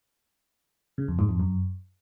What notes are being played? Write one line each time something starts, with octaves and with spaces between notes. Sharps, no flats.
C#3
F2
G#2
F2
F#2